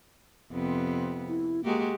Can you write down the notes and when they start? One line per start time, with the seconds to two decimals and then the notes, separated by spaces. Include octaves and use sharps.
0.51 F2 C3 B3
1.28 E4
1.64 G#3 A#3 F#4 G4